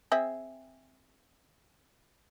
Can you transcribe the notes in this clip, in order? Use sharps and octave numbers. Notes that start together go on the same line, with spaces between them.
C4 G#4 E5